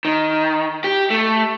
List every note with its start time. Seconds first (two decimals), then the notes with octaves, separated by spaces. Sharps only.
0.05 D#3
0.84 G4
1.10 A3